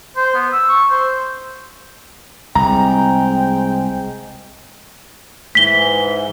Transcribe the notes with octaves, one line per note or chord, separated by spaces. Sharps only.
C5
B3
E6
C#6
C5
C2 G#3 C4 G5 A#5
G#2 E3 B6 G7